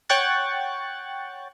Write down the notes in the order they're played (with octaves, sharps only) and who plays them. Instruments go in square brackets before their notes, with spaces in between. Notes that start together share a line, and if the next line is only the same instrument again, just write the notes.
[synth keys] C#5 F#5 G5 C#6 F#6 A6